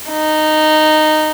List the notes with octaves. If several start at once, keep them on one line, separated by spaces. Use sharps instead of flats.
D#4